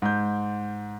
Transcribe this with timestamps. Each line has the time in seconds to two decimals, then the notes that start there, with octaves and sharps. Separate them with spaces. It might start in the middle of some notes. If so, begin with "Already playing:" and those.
0.02 G#2 G6